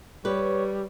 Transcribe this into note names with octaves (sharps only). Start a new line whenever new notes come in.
G3 B4 C#5